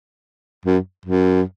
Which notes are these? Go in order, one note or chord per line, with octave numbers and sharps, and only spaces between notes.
F#2
F#2